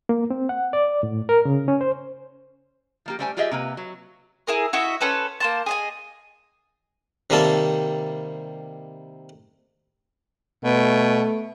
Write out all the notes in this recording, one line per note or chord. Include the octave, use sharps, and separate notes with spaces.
A#3
C4
F#5
D5
A2
A#4
C#3
C#4
C5
F3 A#3 G4
G3 A3 G4 C5 G5 G#5
G3 F4 G4 G#4 D#5 E5
C3 A#3 B4
F#3
E4 G#4 A#4
E4 F#4 D#5 E5
C#4 A4 B4 C5
A#3 C5 A5
G#4 D#5 G#5
C3 D#3 G3 A#3 A4 A5
B2 A3